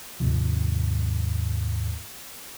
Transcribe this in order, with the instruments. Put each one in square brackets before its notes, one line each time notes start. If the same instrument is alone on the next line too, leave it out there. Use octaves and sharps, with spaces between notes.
[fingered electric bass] D#2 G#2 C3 F3